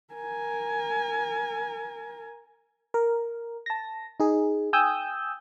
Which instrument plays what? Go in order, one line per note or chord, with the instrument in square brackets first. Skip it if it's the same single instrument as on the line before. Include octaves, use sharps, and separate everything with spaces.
[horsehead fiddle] A#4 G#5
[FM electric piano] A#4
A5 A#6
D#4 G#4
G5 G#5 D#6 E6 G6